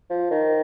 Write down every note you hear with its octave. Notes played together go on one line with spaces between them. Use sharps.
F3
D#3